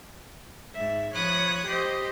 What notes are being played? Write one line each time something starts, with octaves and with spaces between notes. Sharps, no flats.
G#2 E5
F3 C#5 B5 D#6 F#6
G4 C5 D#5